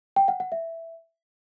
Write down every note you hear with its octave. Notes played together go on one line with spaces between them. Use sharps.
G5
F#5
F#5
E5